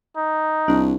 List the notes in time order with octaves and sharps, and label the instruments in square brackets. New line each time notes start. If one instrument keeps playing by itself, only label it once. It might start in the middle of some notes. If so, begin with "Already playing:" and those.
[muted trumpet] D#4
[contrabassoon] C2 [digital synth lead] D4